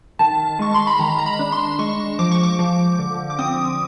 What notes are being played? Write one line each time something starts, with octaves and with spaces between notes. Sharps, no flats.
D#3 A5
G#3 C#6
C6
B5
D#3 A#5
A#5
B5
D4
C6
G#3 C#6
F3 D6
C#6
D6
F3
D3
D6
C4 D#6